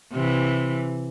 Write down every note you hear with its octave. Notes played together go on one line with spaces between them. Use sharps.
C3 E3